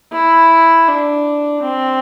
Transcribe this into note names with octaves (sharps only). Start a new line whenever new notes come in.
E4
D4
C4